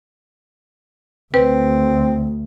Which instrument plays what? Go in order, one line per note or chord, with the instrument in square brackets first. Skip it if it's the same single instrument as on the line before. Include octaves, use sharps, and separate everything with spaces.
[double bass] D2 [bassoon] C4 [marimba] B4